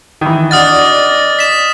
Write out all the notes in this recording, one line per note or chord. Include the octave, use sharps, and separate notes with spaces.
D#3 E3
D4 F#4 D5 D#5 D#6 F6 A6
B6 E7